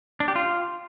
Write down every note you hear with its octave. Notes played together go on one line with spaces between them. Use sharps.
D4
G4
F4